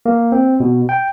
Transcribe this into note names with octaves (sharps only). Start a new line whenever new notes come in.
A#3
C4
B2
G5